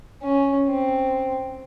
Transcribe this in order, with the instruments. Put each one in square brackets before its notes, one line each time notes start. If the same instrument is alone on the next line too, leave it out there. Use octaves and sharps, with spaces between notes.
[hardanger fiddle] C#4
C4